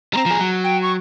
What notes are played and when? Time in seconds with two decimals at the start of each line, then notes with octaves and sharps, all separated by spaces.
0.13 G3 C4 A#5
0.26 F3 G#4
0.39 F#3
0.64 G5
0.82 C#6